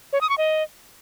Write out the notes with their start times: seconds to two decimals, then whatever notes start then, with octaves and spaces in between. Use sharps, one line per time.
0.13 C#5
0.21 D#6
0.29 C#6
0.38 D#5